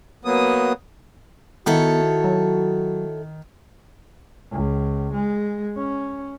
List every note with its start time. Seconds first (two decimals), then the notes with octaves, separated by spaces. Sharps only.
0.25 F#3 A#3 B3 D#6
1.66 D#3 B3 E4 F#4 A4 C#5
2.24 F#3
4.52 C#2
5.14 G#3
5.77 C#4